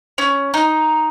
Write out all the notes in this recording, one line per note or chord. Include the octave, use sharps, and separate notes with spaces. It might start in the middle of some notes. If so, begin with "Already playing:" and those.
C#4
D#4